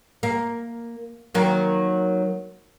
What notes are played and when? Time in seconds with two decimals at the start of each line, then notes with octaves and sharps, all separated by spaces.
0.23 A#3
1.35 D#3 F#3 A#3